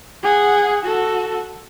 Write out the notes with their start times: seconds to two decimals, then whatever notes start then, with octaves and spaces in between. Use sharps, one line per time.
0.23 G#4 F#5
0.85 F#4 A4